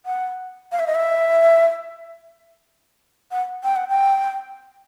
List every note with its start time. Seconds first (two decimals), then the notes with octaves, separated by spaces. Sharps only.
0.06 F#5
0.72 F5
0.79 E5
0.87 D#5
0.95 E5
3.31 F#5
3.64 G5
3.76 F#5
3.88 G5